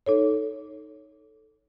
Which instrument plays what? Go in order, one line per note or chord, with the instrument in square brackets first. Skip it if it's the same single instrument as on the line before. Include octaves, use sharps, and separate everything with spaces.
[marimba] D#4 A4 C#5